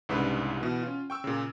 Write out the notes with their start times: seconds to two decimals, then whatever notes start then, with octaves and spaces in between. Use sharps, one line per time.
0.09 C2 G#2 C#3 D4 B4
0.61 B2 E3
0.83 C#4 F4
1.10 G5 C#6 E6
1.24 A#2 C#3